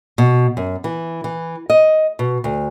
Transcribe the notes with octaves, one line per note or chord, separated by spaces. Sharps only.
B2
F#2
E3
E3
D#5
B2
D2